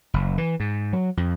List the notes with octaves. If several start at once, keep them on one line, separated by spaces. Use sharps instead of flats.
F#1
E3
G#2
F#3
F2